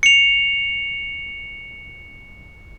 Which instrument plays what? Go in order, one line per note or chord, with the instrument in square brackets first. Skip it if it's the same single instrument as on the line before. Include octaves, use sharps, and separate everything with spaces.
[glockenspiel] C#7 F7